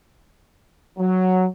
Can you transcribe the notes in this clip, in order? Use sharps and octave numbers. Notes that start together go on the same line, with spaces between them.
F#3